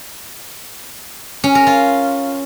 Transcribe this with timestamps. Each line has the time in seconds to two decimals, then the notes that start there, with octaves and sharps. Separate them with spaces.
1.44 C#4
1.55 A#4
1.67 F4